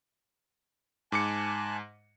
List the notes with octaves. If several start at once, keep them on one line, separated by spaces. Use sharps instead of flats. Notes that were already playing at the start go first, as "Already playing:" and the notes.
G#2 G#5 A5 D6 F#6 C#7